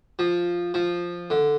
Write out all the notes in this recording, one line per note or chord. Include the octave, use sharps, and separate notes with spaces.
F3
F3
D3